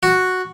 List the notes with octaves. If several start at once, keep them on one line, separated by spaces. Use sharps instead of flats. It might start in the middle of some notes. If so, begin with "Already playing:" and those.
F#4